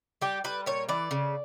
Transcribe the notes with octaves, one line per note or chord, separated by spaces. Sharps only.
G3 G4
G3 B4
A#2 C#5
E3 D5
C#3